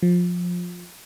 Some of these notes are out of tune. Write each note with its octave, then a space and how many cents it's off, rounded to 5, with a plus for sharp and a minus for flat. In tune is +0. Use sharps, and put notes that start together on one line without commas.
F3 +20